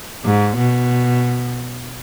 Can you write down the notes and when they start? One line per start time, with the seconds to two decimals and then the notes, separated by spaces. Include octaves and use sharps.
0.25 G#2
0.57 B2